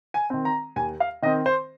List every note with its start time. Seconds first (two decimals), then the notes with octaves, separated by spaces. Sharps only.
0.14 G#5
0.30 D#3 C4
0.45 A#5
0.76 D#2 G#5
1.00 F5
1.23 D#3 C4 D#5
1.46 C5